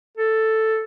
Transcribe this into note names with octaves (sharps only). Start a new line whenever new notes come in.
A4